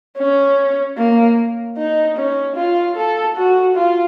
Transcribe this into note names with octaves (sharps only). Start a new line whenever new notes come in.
C#4
A#3
D#4
C#4
F4
A4
F#4
F4